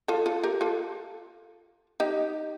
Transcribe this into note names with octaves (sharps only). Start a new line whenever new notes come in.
F4 A4
F4 A4
G4 A#4
F4 A4
D#4 G4